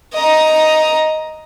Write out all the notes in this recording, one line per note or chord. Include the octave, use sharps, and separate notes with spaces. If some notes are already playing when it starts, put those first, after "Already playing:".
D#5 A#5